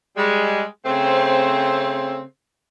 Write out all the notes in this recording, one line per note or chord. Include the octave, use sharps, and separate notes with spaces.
G3 G#3
C#3 A3 C4